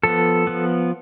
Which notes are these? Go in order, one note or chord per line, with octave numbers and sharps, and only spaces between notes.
F3 B3 A4
F3 B3